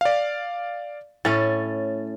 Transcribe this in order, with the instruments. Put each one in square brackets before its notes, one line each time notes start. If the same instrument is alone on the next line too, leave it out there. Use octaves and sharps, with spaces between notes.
[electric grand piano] D5 F5
[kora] A2 C#4 [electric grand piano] A6